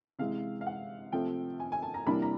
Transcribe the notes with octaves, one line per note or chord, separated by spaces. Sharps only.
C3 E3 G#3 F5
F5
F#5
C3 F3 A3 C4 G5
G#5
G#5
A5
A#5
C3 E3 G3 A#3 D4 B5
A#5